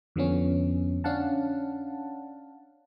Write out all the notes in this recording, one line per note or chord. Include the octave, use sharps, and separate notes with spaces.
F2 D3 F3 B3 C#4
C#4 D4 F5 F#5 A5